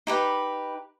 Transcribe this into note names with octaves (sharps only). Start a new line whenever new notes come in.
D#4 G4 B4